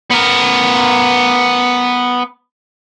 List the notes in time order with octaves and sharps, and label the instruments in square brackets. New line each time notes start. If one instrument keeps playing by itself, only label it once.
[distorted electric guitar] B3 A#4